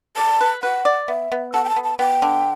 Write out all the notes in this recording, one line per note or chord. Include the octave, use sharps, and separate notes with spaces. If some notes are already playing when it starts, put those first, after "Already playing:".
D5 A5
B4
B4 F#5
D5
B3 E5
B3
A4 F#5
G5
A5
B3
A5
B3 G5
D3